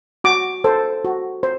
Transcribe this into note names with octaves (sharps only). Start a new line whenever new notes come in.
F#4 D6
A4 C5
F#4
C5